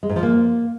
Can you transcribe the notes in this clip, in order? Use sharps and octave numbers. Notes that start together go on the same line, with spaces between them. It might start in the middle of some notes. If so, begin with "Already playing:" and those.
G#3
G#2
F3
A#3